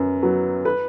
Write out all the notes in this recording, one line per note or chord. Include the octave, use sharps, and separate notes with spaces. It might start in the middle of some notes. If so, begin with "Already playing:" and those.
Already playing: F#2 B3
F#3 B3
B4